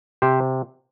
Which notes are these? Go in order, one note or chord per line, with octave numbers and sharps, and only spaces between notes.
C3 G4 C5